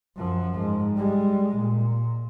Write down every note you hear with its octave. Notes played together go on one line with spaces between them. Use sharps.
F#2 F3
G#2
G3 G#3
A#2